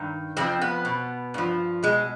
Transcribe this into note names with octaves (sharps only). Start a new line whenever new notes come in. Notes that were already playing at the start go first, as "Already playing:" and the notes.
Already playing: G2 D#3
F2 D3 F3 C4
B3
B2
G2 F3
B2 G#3